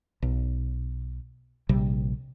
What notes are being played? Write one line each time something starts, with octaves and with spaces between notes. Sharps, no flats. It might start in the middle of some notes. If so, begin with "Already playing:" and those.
B1
A#1 C3 G3